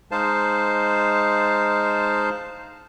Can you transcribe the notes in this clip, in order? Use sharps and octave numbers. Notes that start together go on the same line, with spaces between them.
G#3 D#4 C5 F5 A5